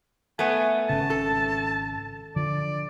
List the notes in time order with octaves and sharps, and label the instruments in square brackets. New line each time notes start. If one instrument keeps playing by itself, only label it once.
[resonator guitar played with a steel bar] A3 B3 [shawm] G#5
[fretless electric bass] G#1 C#3 [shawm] A5
[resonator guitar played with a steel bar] A4
[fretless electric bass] D3 F3 [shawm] D5